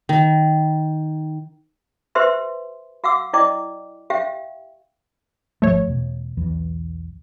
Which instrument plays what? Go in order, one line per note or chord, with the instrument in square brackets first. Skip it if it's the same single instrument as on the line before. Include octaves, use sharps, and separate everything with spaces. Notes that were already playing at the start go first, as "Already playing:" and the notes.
[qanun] D#3
[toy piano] G4 B4 C5 E5 C6
F#4 F5 F#5 D6 E6
E4 D5 D#5 G5 D6
G4 E5 F5 G5
[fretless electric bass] G#1 C#2 F3 [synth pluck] A3 C#5
[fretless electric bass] E2 B2
B1 E2 E3